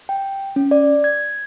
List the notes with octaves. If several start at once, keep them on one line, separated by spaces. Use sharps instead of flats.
G5
C#4
D5
G#6